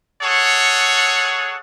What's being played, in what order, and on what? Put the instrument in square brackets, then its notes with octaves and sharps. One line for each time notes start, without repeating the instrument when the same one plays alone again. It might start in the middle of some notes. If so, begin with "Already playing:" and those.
[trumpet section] G#4 A4 C#5 F#5